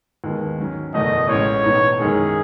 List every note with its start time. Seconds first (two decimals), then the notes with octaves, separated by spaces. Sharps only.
0.24 D#2 D#3 G#3 B3
0.58 G#2 F#3 C#4
0.94 F#1 E2 B2 A3 D#5
1.29 A1 A2 G#3 C#4 C#5
1.64 B1 A2 E3 B3 D#4
2.00 F#2 D#3 G#3 C#4 G#4